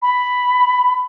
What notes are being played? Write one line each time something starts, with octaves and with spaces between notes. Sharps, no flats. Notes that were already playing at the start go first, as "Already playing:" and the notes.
B5